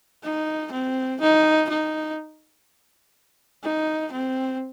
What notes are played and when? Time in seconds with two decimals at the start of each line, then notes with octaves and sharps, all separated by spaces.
0.23 D#4
0.72 C4
1.21 D#4
1.69 D#4
3.64 D#4
4.12 C4